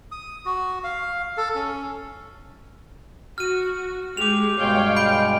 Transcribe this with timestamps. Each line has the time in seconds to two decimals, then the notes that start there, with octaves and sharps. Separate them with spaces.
0.12 D#6
0.46 F#4
0.84 F5
1.37 A4
1.55 C#4
3.38 F#4 F6 D#7
4.17 G#3 G4 D6 F7
4.60 G2 B2 G#3 C#5 F5 G5
4.96 B5 G6 D7